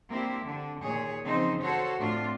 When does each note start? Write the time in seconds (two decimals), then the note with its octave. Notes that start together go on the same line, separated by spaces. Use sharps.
0.10 A#3 C4 D4 E4 G4
0.45 D3 D4
0.81 D#2 A#2 G#4 C#5
1.23 C#3 E3 F3 C4 D#4 C5
1.61 F#4 A4 C5 C#5
1.99 A2 C4 D4 F4